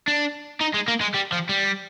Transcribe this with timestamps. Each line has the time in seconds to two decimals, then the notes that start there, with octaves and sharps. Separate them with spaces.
0.08 D4
0.61 D#4
0.74 G#3
0.88 A#3
1.01 G#3
1.14 G3
1.32 F3
1.49 G3